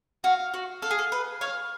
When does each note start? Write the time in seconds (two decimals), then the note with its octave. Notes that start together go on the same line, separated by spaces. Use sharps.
0.24 F#4 F5
0.54 F#4
0.82 A4 F5
0.91 G#4
0.99 A4
1.12 B4
1.41 C#5 F5